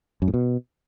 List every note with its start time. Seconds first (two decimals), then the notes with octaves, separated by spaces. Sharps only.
0.22 F#2
0.28 A2
0.34 B2